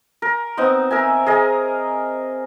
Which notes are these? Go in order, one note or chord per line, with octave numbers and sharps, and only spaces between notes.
A#4
B3 C4 D#4
A#4 E5 G#5
G#4 A#4 D#5